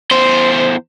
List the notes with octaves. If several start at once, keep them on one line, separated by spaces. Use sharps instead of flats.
E2 C5